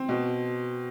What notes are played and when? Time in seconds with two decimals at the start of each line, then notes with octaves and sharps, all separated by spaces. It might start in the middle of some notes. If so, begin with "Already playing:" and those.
Already playing: C4
0.09 B2